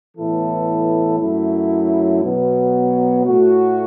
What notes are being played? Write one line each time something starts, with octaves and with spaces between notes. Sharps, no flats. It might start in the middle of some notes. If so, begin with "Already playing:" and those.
A2 E3 B3 E4 A4
F#2 F#3 A3 E4
B2 F#3 B3
A2 A3 F#4